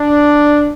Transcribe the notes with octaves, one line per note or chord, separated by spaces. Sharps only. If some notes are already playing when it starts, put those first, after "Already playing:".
Already playing: D4